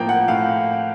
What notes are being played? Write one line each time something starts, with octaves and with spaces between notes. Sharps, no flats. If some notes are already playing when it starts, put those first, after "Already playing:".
Already playing: A2 F3 A#3 G5
F#5
A2 F5